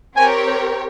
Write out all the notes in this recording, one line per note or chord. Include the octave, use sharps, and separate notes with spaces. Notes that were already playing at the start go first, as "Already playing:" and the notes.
C4 G4 A#4 C#5 G#5